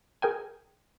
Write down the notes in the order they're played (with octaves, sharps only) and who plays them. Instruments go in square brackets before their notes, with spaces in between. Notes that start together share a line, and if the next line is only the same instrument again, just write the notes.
[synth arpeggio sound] G#4 A#4 G5 G#5